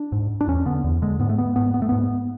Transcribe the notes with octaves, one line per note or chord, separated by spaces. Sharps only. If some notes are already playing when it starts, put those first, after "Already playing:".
Already playing: D4
G#2
D4
E2 C#4
D3 B3
E2
D3 G#3
G#2 B3
A3
B3
G#2 B3
B3
A3
G#2 B3